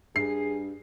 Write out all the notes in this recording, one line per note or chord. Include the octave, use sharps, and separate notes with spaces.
G2 G#4 C7